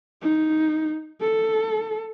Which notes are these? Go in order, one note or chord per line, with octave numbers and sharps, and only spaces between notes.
D#4
A4